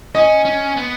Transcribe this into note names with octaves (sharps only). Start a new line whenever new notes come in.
C#4 D#5
C#4
B3